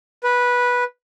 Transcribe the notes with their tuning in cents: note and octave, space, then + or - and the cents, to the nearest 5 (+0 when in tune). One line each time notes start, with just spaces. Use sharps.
B4 -10